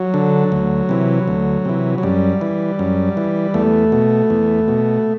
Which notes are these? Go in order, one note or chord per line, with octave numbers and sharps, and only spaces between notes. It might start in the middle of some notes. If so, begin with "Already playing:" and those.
Already playing: F#3
D3
D2
C3 E3
D2
C3 E3
F#3
F#2 G3
E3
F#2
E3
E2 A3
B2
E2
B2